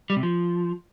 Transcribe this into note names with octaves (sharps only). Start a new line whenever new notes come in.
G3
C3
F3